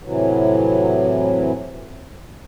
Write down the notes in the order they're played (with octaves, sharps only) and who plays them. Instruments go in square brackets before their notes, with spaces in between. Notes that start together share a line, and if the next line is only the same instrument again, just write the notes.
[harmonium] A2 C3 E3 F#3